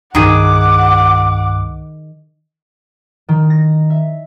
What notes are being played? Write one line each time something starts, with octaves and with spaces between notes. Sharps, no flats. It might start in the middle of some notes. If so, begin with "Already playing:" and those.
C2 G2 D#3 G#4 F#5 D6
D#3
A#6
E5